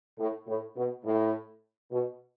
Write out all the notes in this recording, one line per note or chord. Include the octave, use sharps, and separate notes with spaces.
A2
A2
B2
A2
B2